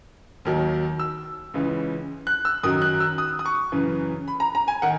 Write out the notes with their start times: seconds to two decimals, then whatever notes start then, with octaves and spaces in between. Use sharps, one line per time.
0.45 D#2 D#3 F#3
0.99 E6
1.54 C#2 C#3 E3
2.27 F#6
2.45 E6
2.63 F#2 D#3 F#3 D#6
2.82 F#6
3.00 E6
3.18 D#6
3.39 D#6
3.46 C#6
3.72 F#2 C#3 E3
4.28 B5
4.40 A#5
4.55 A#5
4.68 G#5
4.82 D#3 F#5